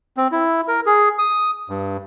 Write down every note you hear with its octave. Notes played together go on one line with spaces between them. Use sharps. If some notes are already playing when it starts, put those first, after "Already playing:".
C4
E4
A#4
G#4
D#6
G2